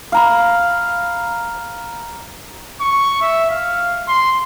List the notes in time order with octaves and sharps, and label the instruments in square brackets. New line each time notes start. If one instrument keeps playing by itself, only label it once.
[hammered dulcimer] F5 A#5 B5
[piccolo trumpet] C#6
E5
F5
C6